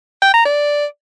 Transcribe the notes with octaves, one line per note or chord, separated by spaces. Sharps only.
G5
A#5
D5